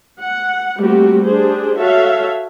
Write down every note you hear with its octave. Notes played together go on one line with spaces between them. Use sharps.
F#5
G3 A3 A#3 C4 F#4 G4
D4 G4 G#4 C5
F#4 A4 C#5 E5 F5